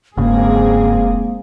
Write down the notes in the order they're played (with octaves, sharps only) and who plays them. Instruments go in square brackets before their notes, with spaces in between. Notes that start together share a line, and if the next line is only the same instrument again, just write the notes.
[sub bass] F1 [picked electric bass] G2 C#3 [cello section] G#3 C4 G#4 [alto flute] A#3